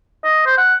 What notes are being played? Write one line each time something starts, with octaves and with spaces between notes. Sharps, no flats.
D#5
C5
F#5